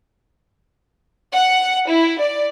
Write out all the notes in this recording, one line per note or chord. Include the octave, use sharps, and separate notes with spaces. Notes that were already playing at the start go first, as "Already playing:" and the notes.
F#5
E4
D5